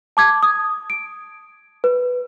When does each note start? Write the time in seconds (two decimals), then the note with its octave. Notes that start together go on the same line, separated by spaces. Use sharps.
0.17 A5 D6 G#6
0.43 D#6
0.90 D7
1.84 B4